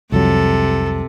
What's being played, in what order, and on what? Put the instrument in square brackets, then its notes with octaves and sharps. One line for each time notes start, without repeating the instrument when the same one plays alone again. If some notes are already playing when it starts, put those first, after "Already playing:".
[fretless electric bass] C2 F2 F#3 [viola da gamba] C3 [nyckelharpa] A4